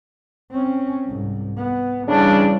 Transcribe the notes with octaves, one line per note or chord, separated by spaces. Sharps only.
C4 C#4
C2 G#2
B3
C#3 E3 G3 C#4 D4